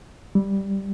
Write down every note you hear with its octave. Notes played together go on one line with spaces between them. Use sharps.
G3